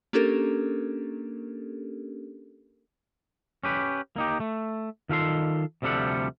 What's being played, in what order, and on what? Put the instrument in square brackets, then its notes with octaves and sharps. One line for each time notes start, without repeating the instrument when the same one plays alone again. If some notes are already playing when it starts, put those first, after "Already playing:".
[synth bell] A#3 C#4 D4 G4 A4 A#4
[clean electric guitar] C#4 G4 B4
A#3 D#4 G4
A3
D#3 F4 A4 C6
D2 C3 F3 G3 A4 F#5